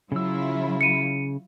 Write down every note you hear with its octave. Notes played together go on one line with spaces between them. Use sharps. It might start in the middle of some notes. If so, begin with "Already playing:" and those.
C#3 F#3 E4 F4 E6
C#7 D#7